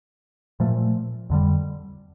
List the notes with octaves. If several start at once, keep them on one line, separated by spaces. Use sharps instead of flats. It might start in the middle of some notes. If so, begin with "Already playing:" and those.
A#2 F3 A3
F2 D3 G3